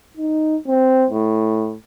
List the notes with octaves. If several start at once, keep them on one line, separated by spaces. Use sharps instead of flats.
D#4
C4
A2